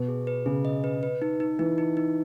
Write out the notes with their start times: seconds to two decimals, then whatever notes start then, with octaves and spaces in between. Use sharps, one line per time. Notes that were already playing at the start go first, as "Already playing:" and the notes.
Already playing: B2
0.08 G#4
0.27 B4
0.46 C#3 G#4
0.65 D#5
0.84 B4
1.03 B4
1.22 D#4
1.40 D#4
1.59 E3 D#4
1.78 D#4
1.97 D#4